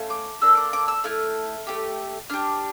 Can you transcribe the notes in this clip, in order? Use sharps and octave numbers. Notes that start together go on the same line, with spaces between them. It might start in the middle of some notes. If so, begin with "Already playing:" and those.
Already playing: A3 C#4 F4
D6
A#3 D4 A4 E6
D6
D6
E6
A3 E4 F6
A3 C#4 G4
D4 G4 F6